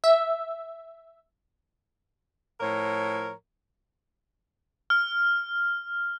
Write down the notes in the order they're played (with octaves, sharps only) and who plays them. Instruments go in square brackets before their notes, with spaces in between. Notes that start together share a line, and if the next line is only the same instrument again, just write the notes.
[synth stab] E5
[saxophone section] A2 F3 A#4 C#5
[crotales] F6